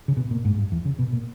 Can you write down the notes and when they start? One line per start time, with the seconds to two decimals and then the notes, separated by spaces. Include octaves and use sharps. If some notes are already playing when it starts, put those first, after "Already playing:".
0.08 C#3
0.17 B2
0.31 A#2
0.45 G#2
0.57 G2
0.72 E2
0.85 C#3
0.99 B2
1.13 A#2